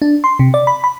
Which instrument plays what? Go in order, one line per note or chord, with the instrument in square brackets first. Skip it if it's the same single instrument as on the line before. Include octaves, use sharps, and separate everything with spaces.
[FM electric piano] D4
C6
C3
D5
B5
B5